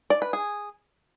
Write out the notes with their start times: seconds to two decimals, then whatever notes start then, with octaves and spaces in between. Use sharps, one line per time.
0.10 D5
0.22 B4
0.33 G#4